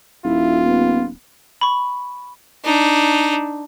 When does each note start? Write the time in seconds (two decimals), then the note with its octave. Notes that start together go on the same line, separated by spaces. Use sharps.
0.25 D#1 E4 F4
0.65 B3
1.61 B5 C#6
2.64 D4 D#4